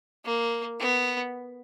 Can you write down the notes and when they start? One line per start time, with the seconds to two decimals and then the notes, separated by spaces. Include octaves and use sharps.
0.25 A#3
0.80 B3